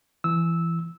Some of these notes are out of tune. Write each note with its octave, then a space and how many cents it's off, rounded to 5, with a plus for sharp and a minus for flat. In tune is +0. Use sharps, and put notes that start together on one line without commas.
E3 +20 E6 -15